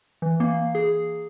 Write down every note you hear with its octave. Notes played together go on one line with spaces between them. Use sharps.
E3
A#3
G#4